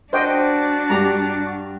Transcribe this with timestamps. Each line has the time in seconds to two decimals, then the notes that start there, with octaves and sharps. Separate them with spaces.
0.13 D4 F#4 C5 D#5 G5
0.90 G2 G4 A#5